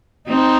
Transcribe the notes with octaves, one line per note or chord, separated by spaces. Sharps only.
C4 D#4